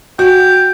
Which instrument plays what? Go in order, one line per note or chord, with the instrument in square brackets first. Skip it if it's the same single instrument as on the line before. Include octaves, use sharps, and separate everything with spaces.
[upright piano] F#4 [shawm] G5